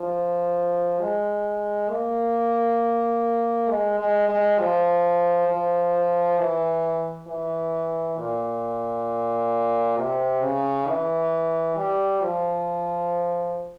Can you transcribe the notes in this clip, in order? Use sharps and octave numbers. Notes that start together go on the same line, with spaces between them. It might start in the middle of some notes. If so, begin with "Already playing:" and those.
Already playing: F3
G#3
A#3
G#3
G#3
G#3
F3
F3
E3
E3
A#2
C3
C#3
E3
G3
F3